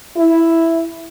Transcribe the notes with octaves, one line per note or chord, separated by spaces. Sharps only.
E4